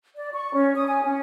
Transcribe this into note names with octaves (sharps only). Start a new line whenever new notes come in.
D5
C#6
C#4
D#6
G#5
C#4